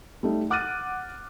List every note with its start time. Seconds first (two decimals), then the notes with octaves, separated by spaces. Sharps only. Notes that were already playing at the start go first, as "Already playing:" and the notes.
0.23 G3 A3 D#4
0.50 F#5 D6 F6 F#6 A6 D#7